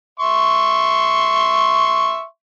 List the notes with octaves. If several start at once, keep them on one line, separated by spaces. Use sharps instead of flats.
E5 C6 C#6